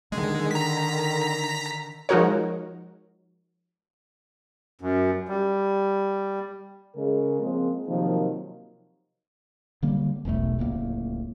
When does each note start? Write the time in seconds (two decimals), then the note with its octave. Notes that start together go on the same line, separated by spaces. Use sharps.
0.12 D3 D#3 G#3
0.51 A#5 B6
2.09 F3 G#3 D#4 F#4 A#4 C#5
4.81 F#2
5.28 G3
6.95 C#3 G#3 A#4
7.41 F3 G#3 A#3 C4
7.87 C3 D#3 F3 F#3 A#3 D#4
9.83 D3 G3 A#3
10.25 E1 B1 C#3 A3
10.59 D1 C#2 A2 A#3